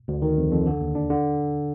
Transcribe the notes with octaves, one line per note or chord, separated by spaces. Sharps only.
D2
D#3
F2
F2
D3
D#2
D4
D3